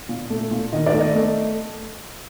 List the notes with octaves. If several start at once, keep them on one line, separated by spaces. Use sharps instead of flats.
A#2
A3
A#2
D#3 D#5
D5
A3
D#5
A3